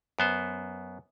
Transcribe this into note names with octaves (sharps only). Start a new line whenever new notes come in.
F#2 B3 C5